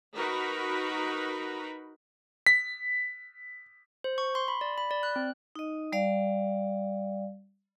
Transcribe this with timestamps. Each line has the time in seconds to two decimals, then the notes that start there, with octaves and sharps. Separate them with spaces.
0.16 D#4 F#4 A#4 B4 B5
2.47 B6
4.04 C5
4.18 C#6
4.35 C6
4.48 B5
4.61 D5
4.78 B5
4.91 D5
5.03 F#6
5.16 C4
5.56 D#4 D#5
5.92 G3 D5 F5